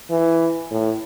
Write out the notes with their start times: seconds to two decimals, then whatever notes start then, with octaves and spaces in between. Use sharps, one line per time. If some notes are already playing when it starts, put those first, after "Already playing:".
0.11 E3
0.72 A2